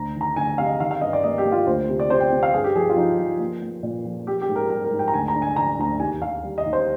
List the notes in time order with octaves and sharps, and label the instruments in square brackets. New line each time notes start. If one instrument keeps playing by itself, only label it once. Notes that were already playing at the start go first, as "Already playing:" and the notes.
Already playing: [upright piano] D2 A#5
D#3
A#5
D2 G#5
C3 F5
D#5
D#3 F5
F5
G2 D#5
D5
A#3 D#5
G4
A#3
F4
D2 C5
C3
D5
C3 C5
G5
C3
F5
G2 G#4
G4
F3 G#4
F4
F3 D#4
F3
A#3
A#3
A#2
F3
A#3 G4
G4
G#2
A#4
G3 A#4
A#4
G#2
G5
A#5
D2 G#5
A#5
D3
G#5
D3 A#5
D2 A#5
D#2 G#5
D#2 F5
G3
D#5
D#2
C5